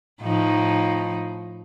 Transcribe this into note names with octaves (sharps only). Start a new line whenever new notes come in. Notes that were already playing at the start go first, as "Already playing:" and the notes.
A2 F3 D#4